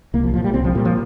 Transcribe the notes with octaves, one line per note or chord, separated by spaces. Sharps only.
C2 A#3
F3
A#2 F3
G3
C2 C4
F3
A#2 G3
F3